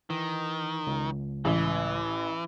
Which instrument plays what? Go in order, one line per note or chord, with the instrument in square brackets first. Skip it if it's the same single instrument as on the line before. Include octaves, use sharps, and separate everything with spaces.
[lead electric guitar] D#3 [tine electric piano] E3
[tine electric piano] C#2
[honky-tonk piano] A1 [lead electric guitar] E3